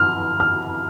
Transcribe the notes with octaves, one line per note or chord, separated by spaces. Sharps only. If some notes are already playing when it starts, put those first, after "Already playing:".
Already playing: F6
F6